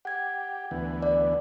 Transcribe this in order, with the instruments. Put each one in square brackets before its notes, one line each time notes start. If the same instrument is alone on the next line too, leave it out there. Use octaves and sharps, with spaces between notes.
[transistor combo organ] G4 [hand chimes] F#5 G#6
[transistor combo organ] D2 E3 B3
[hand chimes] D5